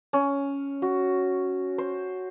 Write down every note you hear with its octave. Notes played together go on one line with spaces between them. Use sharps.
C#4
F#4
C5